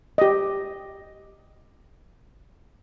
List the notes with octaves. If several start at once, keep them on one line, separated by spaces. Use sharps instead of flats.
G4 D#5